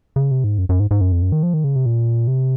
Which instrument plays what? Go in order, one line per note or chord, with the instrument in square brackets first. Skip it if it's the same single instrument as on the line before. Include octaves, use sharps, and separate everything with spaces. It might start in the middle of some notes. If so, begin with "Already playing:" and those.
[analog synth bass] C#3
C3
G#2
F#2
F#2
G#2
G#2
F#2
F2
F#2
D#3
F3
D#3
C#3
C3
A#2
C3